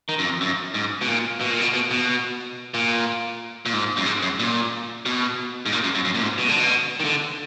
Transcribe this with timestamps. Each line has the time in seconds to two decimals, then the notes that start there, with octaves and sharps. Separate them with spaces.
0.09 D#3
0.19 F#2
0.24 F2
0.41 F#2
0.74 G#2
1.01 B2
1.08 A#2
1.41 B2
1.51 A#2
1.61 B2
1.74 B2
1.91 B2
2.74 A#2
3.66 A#2
3.73 G#2
3.97 F#2
4.06 G#2
4.22 F#2
4.39 A#2
5.06 B2
5.66 G#2
5.72 A#2
5.83 F#2
5.95 F#2
6.05 F#2
6.14 A#2
6.22 G#2
6.38 B2
6.49 D3
6.59 B2
7.00 D#3
7.05 D3